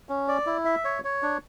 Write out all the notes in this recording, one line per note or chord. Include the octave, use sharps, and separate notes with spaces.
C#4
D5
E4
E5
C#5
C#5
D4